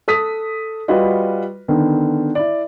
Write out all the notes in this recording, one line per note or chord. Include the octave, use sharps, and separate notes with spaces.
A4 D#6 B6
G3 F4 F#4 B4 D#5
D3 D#3 B3
E4 D5